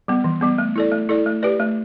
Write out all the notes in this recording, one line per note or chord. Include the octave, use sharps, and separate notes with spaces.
G3 B3
E3
G3 B3
A3
E4 A4 D5
A3
E4 A4 D5
A3
G4 B4 D5
A3